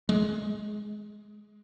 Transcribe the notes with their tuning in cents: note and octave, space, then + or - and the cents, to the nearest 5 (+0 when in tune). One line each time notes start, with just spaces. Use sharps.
G#3 +10